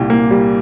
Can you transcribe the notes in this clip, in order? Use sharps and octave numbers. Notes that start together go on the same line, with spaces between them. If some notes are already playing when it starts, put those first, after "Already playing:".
Already playing: C2 A#2 G4
A#3
G3